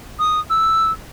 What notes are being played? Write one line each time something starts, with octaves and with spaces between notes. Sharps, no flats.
D#6
E6